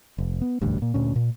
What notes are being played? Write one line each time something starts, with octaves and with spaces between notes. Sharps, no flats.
F1
B3
E1 A1 D2 G2
A#2
D2 A#2 C#4
A#2